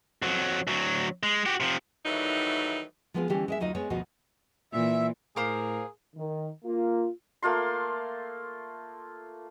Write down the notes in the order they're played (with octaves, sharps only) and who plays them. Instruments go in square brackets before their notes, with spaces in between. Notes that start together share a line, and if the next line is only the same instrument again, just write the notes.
[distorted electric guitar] F2 F#3
D2 F#3
G#3
F#4 G4
C3 F3
[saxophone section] D#3 E3 F#3 G3 A3 D#4
[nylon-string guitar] F3 G#3 B3 C4 D#4 F4
D3 E3 G3 B3 C#4 G4
G#3 D#5 E5
D2 F#3 D#4 F4 D#5
G#3 B3 C4 C#5
D2 B2 F3 F#4 D#5
[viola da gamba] A#2 E3 [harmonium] E5
[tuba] A2 [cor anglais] G#4 [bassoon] A#4 [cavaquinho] C5 F5 D6
[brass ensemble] D#3
A#3 F4
[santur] A3 A#3 F4 C6